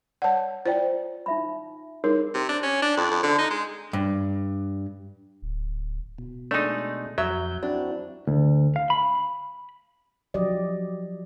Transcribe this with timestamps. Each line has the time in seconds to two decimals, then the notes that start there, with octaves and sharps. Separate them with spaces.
0.22 C#5 D5 F#5 A5
0.66 F4 C5 D5 G5
1.26 D#4 E5 B5
2.04 D#4 G#4 A#4 C#5
2.34 C3
2.49 D4
2.63 C#4
2.82 D4
2.97 F2
3.10 F2
3.23 D3
3.39 D#4
3.51 G#3
3.93 G2
5.42 D1
6.18 B2
6.51 G#3 A3 D4 D#4
7.18 F2 F#3 E5 G6
7.63 C4 D4 E4 F#4
8.27 D2
8.76 F5
8.90 B5
10.34 F3 F#3 G4 D5 D#5